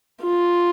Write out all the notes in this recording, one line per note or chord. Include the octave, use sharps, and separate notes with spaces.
F4